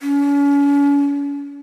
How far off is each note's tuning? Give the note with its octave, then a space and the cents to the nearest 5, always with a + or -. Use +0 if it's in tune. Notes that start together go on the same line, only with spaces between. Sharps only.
C#4 +40